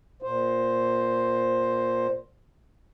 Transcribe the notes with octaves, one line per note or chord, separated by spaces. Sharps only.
A#2 C5